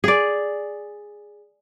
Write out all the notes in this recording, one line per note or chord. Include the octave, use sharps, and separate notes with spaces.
G#4 D5